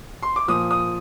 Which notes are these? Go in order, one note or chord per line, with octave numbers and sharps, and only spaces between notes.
C6
D6
A#2 F3 D#6
D#6